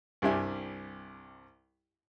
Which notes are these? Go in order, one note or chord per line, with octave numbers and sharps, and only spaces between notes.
C2 G2 G4 E5 G#5